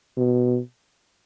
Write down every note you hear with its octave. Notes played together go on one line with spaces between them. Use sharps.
B2